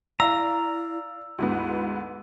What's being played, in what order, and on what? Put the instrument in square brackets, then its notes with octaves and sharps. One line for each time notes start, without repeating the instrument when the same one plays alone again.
[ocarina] E4 [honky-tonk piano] D5 F5 [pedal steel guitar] A#5 [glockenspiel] E6
[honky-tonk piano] D2 G#2 B3 [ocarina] E4